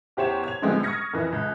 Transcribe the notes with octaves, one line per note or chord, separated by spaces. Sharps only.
E2 G4 C5 C#5 E7
G#6 F7
D3 F3 G3 G#3 B3 C4
C#6 D#6 F6 G#6 A#6 C#7
F2 E3
C#2